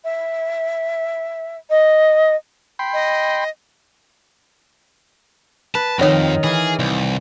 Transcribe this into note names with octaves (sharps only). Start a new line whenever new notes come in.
E5
D#5
G5 B5 C6
D#5
B4 A5
F2 D#3 D#4 C#5 F#5 G5 A#5
E3 G#4 F5
C2